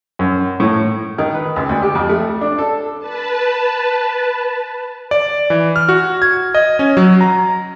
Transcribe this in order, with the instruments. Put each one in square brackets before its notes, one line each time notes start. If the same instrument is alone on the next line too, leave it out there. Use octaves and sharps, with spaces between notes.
[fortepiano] F#2
A2
D#3
B4
C#2
D2
G4
F2
A3
D4
A4
[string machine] B4 A5
[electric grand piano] D5
E3
F6
F#4
G#6
D#5
C#4
F#3
A#5